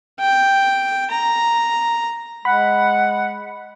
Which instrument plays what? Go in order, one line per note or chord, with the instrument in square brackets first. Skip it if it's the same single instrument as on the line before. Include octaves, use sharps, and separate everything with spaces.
[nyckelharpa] G5
A#5
[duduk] G#3 [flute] F#5 [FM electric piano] B5